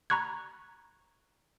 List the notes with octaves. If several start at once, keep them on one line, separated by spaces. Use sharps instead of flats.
A#5 B5 C#6 F#6 G#6